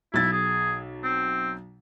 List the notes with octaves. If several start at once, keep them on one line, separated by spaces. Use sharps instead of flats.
B1 E4 A6
G#4
C4